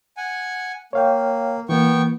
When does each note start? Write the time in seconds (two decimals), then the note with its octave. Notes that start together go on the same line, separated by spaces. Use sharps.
0.17 F#5 G#5
0.93 A#3 C#5 F5 G5
1.69 E3 A#3 B3 G5 C#6